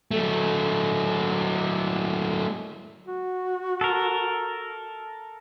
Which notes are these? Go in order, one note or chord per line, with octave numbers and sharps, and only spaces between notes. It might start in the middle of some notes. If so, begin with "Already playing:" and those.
F#3 A3
F#4
A4 A#4